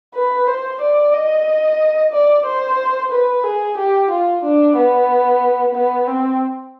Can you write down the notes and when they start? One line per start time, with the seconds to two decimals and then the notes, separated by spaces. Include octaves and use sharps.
0.15 B4
0.47 C5
0.81 D5
1.14 D#5
2.12 D5
2.45 C5
3.11 B4
3.44 G#4
3.77 G4
4.10 F4
4.43 D4
4.76 B3
5.74 B3
6.07 C4